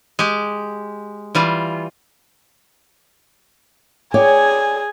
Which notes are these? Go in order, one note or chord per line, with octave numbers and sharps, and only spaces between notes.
G#3 G4
E3 G3 F4
G#4 C#5 D5 G5 G#5